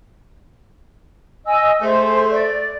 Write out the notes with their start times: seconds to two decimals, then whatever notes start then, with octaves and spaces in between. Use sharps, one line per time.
1.46 D#5 G#5 E6
1.81 A3 G#4 C5
2.30 D5